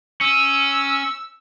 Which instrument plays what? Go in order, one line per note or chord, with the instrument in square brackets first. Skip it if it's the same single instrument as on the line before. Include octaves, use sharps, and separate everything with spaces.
[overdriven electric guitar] C#4 [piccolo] E6